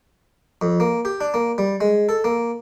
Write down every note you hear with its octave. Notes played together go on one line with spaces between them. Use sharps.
F2
A#3
G4
D4
A#3
G3
G#3
A4
A#3